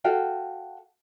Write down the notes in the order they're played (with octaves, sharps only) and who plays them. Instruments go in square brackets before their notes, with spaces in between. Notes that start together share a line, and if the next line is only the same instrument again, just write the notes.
[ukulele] F#4 A4 F5 G5